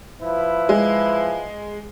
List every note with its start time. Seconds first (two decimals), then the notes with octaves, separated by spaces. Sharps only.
0.22 F3 E4 B4
0.69 G#3